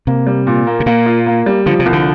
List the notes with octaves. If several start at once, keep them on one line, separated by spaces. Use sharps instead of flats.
C3 A#3
G3
A#2
A#3
C3
A#2 A#3
F4
A#3
G3
D3 F3
C3
C2
D3